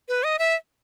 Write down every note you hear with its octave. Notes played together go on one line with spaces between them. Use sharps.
B4
D#5
E5